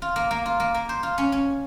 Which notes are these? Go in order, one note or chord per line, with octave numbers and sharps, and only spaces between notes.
F4
A#3
A#3
F4
A#3
A#3
C5
F4
C#4
C#4